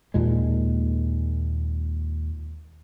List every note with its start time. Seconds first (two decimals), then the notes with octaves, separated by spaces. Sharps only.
0.14 D#2 A#2 G#3